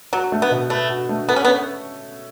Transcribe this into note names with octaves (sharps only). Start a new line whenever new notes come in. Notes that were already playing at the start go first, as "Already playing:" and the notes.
F#3 F#4
A3
B3
B2
A3 B4
F#4
A3
B3 A4
C#4
B3
C#4